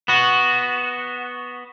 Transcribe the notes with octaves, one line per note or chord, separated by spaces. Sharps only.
B3 F#4